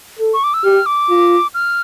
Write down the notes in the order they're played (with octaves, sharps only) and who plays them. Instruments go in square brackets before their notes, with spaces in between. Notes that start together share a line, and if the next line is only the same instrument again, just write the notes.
[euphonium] A4
[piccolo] C#6
D6
E6
[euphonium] G4 [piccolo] F6
[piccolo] D6
[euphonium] F4
[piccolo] F6